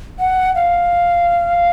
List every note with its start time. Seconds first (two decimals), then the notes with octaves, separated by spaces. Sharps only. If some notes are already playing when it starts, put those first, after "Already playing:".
0.19 F#5
0.55 F5